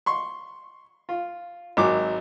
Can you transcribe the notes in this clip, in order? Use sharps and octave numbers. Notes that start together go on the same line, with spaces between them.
C6 C#6
F4
G#1 F#3 D6